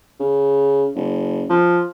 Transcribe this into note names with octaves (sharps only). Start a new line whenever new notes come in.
C#3
F#1
F3